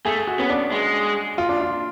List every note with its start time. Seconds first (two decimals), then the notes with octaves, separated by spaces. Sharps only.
0.05 A3 G#4
0.27 F#4
0.39 B3 C#4
0.50 D4
0.72 G#3
1.38 F4
1.49 D4
1.61 F4